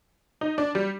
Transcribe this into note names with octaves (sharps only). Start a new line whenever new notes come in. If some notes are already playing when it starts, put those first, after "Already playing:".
D#4
D4
G3